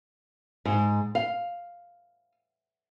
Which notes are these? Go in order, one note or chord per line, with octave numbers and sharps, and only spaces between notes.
G#2
F5